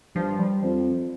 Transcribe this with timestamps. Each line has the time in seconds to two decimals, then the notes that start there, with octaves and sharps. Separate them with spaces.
0.15 G2 F3
0.39 G3
0.62 F2 F3